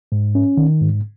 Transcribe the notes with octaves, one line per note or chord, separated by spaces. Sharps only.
G#2
C#4
D#3
G#2